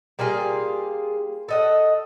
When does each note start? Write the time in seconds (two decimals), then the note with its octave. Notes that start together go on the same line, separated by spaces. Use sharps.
0.19 G3 A#3 F4 G#4
1.49 A4 D#5 F#5